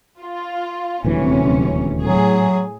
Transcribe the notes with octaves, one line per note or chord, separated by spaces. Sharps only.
F4
D#1 D2 C3 E3 F#3 C#4
A2 F#3 G#4